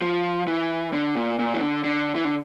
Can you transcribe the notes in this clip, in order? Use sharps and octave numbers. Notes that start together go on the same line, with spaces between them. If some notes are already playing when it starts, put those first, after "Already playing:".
F3
E3
D3
A#2
A#2
E3
D3
D3
E3
D3